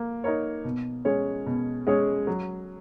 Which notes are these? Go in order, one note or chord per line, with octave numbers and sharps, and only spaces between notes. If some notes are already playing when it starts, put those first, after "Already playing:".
Already playing: A#3
D#4 A#4 C#5
B2
G#3 C#4 G#4 C#5
B2
G#3 C#4 G#4 C#5
F#3